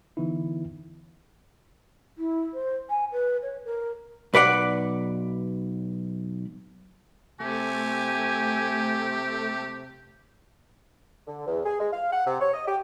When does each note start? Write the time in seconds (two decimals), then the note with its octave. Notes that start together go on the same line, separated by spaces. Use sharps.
0.17 D3 E3 B3 D#4 E4
2.18 E4
2.54 C5
2.90 G#5
3.12 B4
3.42 C#5
3.65 A#4
4.34 B1 B4 D5 F#5
7.40 C3 A3 G4 G#5
11.27 D3
11.47 E2
11.65 G#4
11.79 G#3
11.92 F5
12.12 F#5
12.25 C3
12.41 C#5
12.54 D#5
12.67 G4